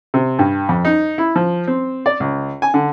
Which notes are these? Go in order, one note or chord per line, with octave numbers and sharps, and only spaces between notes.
C3
G2
F2
D#4
E4
F3
C4
D5
C#2
G#5
D3